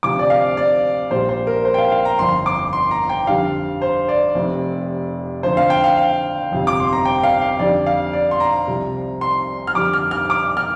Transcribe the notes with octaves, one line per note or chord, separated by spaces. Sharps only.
D2 C3 F3 D6
D5
F5
D5
A#1 A#2 G3 C5
C5
A#4
C5
G5
F5
F5
A#5
G1 F2 F3 C6
D6
C6
A#5
G5
F2 D3 G3 F5
C5
D5
F1 F2 C3
F2 D3 F3 C5
F5
G5
F5
F5
G1 F2 C3 F3
D6
C6
A#5
G5
F5
F5
F2 D3 G3 D5
F5
D5
C6
A#5
C2 C3 F3
C6
F6
F2 D3 G3 D6
F6
F6
D6
F6